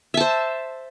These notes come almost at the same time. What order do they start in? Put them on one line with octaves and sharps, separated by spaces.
E5 A5 C5